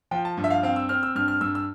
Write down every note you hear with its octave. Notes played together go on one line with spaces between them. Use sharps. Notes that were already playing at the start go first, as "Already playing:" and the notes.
F3 G5
A5
G2
E5
F5
C4 F5
E6
C4 F6
E6
G2 F6
F6
G2 E6
E6